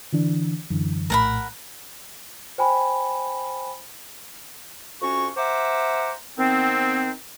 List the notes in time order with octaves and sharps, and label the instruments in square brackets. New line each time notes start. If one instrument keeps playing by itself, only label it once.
[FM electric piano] D3 E3 D4
F#2 D3 E3
[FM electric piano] A#1 A2 A5 [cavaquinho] A#4 F#5 B5
[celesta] C5 G5 G#5 B5
[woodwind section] F2 C#4 F#4 C#6
C5 E5 F#5 A#5 D6
D#3 B3 C4